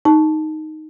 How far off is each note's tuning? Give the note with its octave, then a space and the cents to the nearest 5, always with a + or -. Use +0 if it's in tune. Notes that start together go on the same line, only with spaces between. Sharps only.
D#4 +0 A5 -10